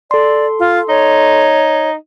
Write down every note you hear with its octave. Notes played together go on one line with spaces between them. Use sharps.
A4 D5 C6
F4
D#4 C#5